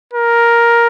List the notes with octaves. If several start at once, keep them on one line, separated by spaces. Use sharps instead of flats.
A#4